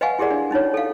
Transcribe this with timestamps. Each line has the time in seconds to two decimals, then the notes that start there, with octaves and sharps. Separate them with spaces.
0.01 B4 D#5 F5 F#5 G#5 C#6
0.19 E4 G4 G#4 A#4 D5 F#5
0.31 D4
0.51 C#4 D#4 F4 C#5
0.74 A4 F5